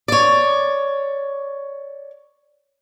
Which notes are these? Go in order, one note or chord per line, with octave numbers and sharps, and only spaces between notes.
C#5 D5